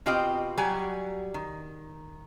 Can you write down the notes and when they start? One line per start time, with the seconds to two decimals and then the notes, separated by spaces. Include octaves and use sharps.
0.06 B2 C4 F4 G4 D#5 G5
0.57 F#3 G3 G4 G#5
1.34 D#3